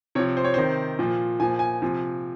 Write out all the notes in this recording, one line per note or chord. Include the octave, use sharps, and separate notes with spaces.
C3 F3 C#5
C5
C#5
C3 D#3 C5
A#2 F3
A#2 F3 G#5
G#5
C3 F3